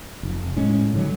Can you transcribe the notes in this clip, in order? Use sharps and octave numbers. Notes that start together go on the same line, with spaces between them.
F1
A2 G#3 C#4
G#2 D3 F#3